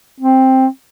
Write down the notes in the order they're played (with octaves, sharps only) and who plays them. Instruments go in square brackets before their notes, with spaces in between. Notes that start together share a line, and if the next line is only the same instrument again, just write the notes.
[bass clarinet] C4